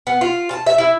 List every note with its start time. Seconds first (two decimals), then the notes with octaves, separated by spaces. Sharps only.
0.07 B3
0.21 F4
0.51 A5
0.66 E5
0.78 E4